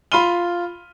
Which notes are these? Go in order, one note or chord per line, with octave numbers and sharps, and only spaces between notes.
F4 B5 C6 F6 D#7 G7